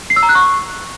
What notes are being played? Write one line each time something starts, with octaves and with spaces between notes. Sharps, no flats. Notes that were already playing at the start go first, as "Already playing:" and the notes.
C7
E6
A#5
F#6
C#6